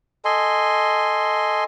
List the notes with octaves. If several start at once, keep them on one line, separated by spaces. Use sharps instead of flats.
A4 D#5 G#5 C6